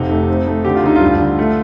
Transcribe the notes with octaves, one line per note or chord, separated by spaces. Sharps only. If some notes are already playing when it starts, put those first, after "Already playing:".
Already playing: F1 C3 D#4
A3
C4
A3
D3 G4
F4
D2 D#4
F4
G2
D3
A3